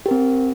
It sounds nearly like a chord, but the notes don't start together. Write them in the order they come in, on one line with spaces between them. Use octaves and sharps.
G4 A#4 C4